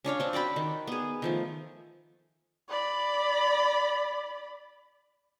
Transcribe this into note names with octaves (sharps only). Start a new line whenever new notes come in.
C#4 D4 C#5 F5
C4 D4
F#4 D5 G5 B5
D#3
B3 G#4
D#3 F3 A3
D5 B5